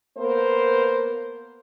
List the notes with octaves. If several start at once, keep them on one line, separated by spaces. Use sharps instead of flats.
A#3 B3 A#4 C5